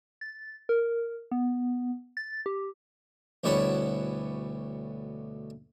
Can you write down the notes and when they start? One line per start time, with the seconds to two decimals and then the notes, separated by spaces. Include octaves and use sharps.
0.21 A6
0.69 A#4
1.32 B3
2.17 A6
2.46 G4
3.44 D2 B2 G3 E4 C#5 F#5